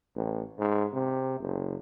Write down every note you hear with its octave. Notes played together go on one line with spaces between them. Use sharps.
A1
G#2
C3
F#1